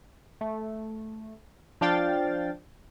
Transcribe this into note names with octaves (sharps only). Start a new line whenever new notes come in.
A3
F3 D4 F5 G5 A6